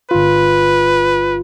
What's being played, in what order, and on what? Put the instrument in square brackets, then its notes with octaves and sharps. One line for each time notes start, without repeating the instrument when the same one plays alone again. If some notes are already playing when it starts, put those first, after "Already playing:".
[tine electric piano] G1 F4 [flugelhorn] B4